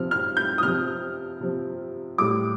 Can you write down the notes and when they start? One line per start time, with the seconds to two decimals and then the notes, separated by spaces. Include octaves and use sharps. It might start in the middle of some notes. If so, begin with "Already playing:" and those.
Already playing: C3 F3 F6
0.11 F6
0.37 G6
0.58 D#6
0.63 C3 F3 F6
1.41 C3 F3
2.18 A2 G3 D6